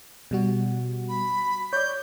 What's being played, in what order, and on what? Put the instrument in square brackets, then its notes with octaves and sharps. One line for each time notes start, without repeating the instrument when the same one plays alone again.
[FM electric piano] B2 G3 F#4
[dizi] B5
[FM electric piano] C#5 D5 [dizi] G6